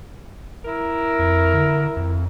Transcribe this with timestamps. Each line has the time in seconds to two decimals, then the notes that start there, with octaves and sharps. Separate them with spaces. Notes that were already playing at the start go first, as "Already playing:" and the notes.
0.65 E4 A#4
1.19 F2
1.54 D3
1.97 F2